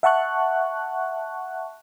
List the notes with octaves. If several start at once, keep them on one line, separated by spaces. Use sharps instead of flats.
E5 F#5 A5 C#6 F#6